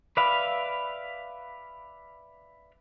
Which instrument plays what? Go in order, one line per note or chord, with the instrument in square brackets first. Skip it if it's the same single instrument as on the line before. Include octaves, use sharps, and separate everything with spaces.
[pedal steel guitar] B4 D5 E5 F5 B5